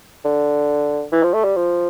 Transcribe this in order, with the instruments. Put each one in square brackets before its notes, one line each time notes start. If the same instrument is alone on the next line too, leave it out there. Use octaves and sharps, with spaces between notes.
[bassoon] D3
E3
F3
A3
G3
F3